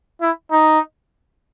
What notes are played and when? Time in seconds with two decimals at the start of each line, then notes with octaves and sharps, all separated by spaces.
0.21 E4
0.52 D#4